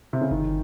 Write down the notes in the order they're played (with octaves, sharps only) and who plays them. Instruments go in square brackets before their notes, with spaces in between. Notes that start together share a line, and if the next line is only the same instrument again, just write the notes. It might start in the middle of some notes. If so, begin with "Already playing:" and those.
[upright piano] C3
C#3
[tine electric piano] G1 [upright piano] D#3